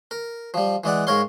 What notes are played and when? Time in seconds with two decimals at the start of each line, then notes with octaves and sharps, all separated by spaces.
0.11 A#4
0.54 F3 G3
0.84 E3 G#3 D5 F#5
1.07 G#2 A#4 C#5 F5 C6